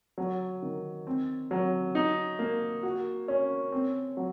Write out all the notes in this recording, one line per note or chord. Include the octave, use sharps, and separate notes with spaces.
F#3
D#3
C4
F#3
D#4
A#3
F#4
C#4
C4
F#3